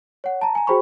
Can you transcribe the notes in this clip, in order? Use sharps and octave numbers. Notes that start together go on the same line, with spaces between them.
C#5 F#5
A5 A#5
G#5 A#5
F#4 G#4 C5 G5 B5 C#6